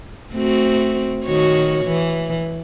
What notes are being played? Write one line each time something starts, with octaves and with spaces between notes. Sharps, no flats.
A3 C4 F#4
D#3 F#4 C#5
E3